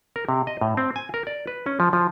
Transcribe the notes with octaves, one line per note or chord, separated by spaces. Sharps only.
A#4
C3
D#5
A2
C4
G#5
A#4
D5
B4
C#4
F3
F3